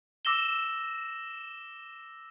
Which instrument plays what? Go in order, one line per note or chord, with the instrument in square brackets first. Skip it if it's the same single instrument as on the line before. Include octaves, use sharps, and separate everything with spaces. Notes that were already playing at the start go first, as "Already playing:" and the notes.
[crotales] D6 E6 A#6 E7 G7